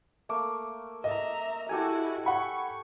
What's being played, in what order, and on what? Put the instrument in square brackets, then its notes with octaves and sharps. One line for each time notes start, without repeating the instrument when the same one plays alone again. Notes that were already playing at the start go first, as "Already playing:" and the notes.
[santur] A3 A#3 D6
[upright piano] D#5 [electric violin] E5 A#5
[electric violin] E4 F#4 [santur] G4 A4 G#5
[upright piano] F#5 B5 [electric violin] C#6